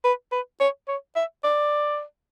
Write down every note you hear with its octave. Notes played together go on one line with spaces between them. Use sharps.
B4
B4
C#5
C#5
E5
D5